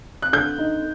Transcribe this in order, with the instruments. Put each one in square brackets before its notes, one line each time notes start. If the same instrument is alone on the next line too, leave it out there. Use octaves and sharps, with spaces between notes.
[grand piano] F#6
[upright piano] D3 [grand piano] G6
[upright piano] D#4